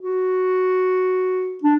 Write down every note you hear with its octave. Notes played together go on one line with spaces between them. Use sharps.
F#4
D4